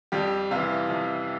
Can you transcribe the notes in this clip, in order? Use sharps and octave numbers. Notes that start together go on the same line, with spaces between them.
F2 G3 G4
C3 E3 F4
F2